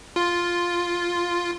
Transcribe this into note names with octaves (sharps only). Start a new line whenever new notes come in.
F4